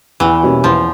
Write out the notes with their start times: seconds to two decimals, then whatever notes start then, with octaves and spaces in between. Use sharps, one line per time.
0.20 E2 E3
0.43 B2 G3 A#3 C#4
0.64 E2 F3